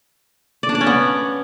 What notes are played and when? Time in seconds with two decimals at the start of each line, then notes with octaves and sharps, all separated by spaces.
0.63 D5
0.69 D4
0.75 D5
0.81 C#4
0.86 B3